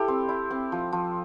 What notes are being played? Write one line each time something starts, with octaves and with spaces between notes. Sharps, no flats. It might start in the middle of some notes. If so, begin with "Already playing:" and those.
Already playing: E4 G4 A4
C4
E4
C4
F3
F3